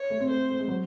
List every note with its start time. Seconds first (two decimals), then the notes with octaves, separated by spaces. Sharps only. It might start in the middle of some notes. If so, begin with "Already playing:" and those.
Already playing: C#5
0.10 A3
0.20 C4
0.30 A3 C5
0.50 A3
0.59 G#3
0.68 F#3